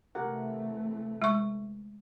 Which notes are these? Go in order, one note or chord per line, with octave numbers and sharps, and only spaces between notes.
C3 E3 A3 G4 A#4 F#5
G#3 C#6